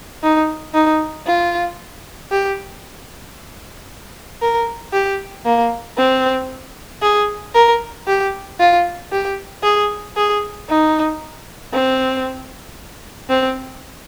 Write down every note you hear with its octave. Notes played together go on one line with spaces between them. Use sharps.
D#4
D#4
F4
G4
A#4
G4
A#3
C4
G#4
A#4
G4
F4
G4
G#4
G#4
D#4
C4
C4